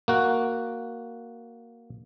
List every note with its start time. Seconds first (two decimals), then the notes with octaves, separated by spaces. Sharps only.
0.08 A#3 F#4